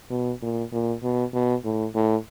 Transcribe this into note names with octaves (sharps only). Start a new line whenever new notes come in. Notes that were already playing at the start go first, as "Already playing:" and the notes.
B2
A#2
A#2
B2
B2
A2
A2